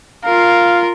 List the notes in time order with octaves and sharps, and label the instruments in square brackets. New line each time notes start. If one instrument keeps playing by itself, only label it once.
[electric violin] F4 A#4 [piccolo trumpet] F5